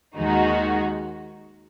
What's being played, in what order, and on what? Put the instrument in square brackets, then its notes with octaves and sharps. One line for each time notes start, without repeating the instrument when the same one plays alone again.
[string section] D#2 D#3 G#3 D#4 F#4